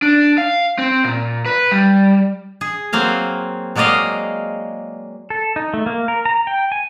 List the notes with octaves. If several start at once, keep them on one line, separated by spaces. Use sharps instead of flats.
D4
F5
C4
A#2
B4
G3
G#4
F#3 A#3 C4 F5
F#3 G#3 A#3 D5 D#5 F5
A4
D#4
A3
A#3
A#4
A#5
G5
G#5